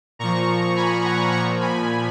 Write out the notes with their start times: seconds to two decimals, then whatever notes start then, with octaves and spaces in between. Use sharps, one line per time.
0.19 A#2 F3 A#5 C#6
0.76 G#5 B5
1.05 F#5 A#5
1.32 A#2 F3 A#5 C#6
1.61 G#5 B5